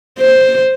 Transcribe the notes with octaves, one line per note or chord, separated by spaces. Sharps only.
C5